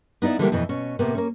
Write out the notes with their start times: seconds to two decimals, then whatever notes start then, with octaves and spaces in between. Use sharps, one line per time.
0.22 B3 D#4 E4 D5
0.39 D3 E3 G3 G#3 A#3 G4
0.52 F2 B2 E3
0.69 B2 C#4
0.99 A2 C3 A#3 B3
1.15 A#3 C#4